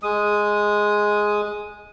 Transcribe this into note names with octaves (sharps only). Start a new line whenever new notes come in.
G#3 D#6